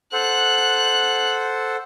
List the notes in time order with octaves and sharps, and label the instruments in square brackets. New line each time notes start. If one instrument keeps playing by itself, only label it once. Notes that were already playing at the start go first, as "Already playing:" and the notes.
[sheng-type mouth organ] A4 C5 F#5 [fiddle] F#6